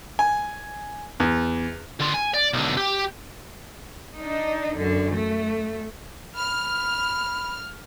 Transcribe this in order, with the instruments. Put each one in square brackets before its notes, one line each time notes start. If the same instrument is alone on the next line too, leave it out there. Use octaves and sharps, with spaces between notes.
[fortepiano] G#5
E2
[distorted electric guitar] D3 F4
G#5
D5
B1 D3
G4
[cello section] D4 D#4
F#2 D3
A3
[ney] B5 [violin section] F6